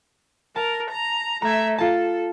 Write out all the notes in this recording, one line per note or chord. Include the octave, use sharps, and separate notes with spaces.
A#4 A5
A#5
A3 E5 A#5 G#6
F4 A4 A5